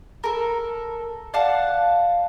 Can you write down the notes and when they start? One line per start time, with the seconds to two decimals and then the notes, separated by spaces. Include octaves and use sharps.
0.24 A4 A#4
1.34 D5 F5 F#5 A5